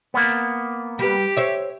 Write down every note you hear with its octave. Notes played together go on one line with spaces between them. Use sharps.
A#3 B3
G3 G4 B4
C5 C#5 E5